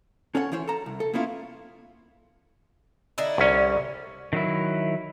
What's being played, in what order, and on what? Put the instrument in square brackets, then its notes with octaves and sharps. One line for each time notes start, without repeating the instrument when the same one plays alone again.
[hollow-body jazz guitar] C#4 A4 C#5 F#5
E3 C#4 E4 C5 C#5
A4 A5 A#5
C2
A4
A#3 B3 C#4 E4 F4
[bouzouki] D3 D#4 E4
[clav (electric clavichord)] C2 C#4
[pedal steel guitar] D#3 F#3 E4